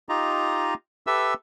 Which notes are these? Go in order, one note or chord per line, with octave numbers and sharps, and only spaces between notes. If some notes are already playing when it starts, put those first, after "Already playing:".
D#4 F4 G4 D#5 A#5
G4 A4 B4 E5 E6